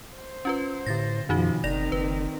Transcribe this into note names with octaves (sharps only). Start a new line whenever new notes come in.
C5
C#4 F4 B4
A2 D3 A6 A#6
F#2 B2 D#3 F3 D#4 F#4
F#1 D#3 C4 D5 A#6 F7
F#1 B4